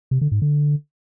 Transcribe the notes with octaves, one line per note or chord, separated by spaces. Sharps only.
C3
D3
G#2
D3